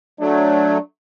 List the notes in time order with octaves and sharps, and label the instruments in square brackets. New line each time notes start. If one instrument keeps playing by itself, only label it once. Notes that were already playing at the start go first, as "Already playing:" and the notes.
[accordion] F#3 A3 [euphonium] D4